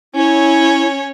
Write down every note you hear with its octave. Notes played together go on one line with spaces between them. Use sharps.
C#4 E4 C#5